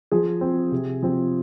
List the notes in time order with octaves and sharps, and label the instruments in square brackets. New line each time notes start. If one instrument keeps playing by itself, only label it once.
[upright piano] F3 G#4
C4
C3
F3 C4